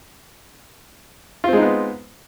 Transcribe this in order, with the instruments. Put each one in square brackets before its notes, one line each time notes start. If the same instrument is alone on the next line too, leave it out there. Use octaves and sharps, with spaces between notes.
[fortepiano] F4
C4
G#3
D#4
B3